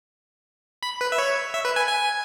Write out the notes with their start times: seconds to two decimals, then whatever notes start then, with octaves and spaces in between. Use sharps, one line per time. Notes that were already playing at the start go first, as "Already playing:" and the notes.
0.83 B5
1.01 B4
1.12 E5
1.18 C#5
1.54 E5
1.65 B4
1.76 G#5
1.88 G#5